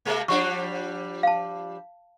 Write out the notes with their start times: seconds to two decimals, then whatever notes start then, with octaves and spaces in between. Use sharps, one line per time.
0.05 C3 G#3 A#3
0.28 F3 G3 D4 C#6
1.23 F5 A5